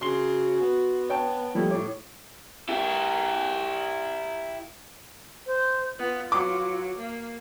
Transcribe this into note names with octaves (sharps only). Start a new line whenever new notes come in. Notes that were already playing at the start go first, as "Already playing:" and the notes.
C#3 F#4 C6 C7 G7
B3
C#5 G5 A5
F3 G3 A3 E4
A2 C#5 D6
E4 G4
C5
B3 F4
F#3 D6
A#3